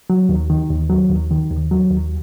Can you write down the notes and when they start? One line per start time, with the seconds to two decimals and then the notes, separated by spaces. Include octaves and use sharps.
0.10 F#3
0.29 D#2
0.50 D#3
0.70 D#2
0.90 F#3
1.10 D#2
1.31 D#3
1.51 D#2
1.71 F#3
1.91 D#2